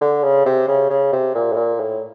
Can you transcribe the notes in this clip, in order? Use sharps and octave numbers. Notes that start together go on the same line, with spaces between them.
D3
C#3
C3
C#3
C#3
C3
A#2
A2
A#2
A2